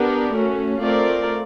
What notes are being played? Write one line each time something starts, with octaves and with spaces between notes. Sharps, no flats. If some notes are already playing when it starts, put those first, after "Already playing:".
Already playing: B3 D4 G4 A#4
A3 C#4 F#4
A3 C4 F4 A#4 D5